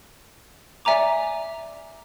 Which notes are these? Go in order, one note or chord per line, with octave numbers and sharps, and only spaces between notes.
D5 E5 G#5 A#5 D6